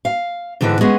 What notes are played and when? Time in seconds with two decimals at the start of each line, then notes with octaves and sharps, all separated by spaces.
0.05 F5
0.61 G#2 D3 E3 G#3 C4
0.81 G#3 B3 C#4 G#4 F#5